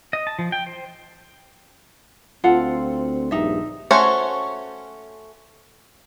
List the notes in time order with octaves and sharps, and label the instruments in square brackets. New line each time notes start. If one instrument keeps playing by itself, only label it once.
[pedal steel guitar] D#5
A5
F3
G5
C5
[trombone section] D2 C4 [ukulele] F4 A4 F#5
[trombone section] A#1 G2 [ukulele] D#4 E5
[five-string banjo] A3 C#4 F#4 C5 C#5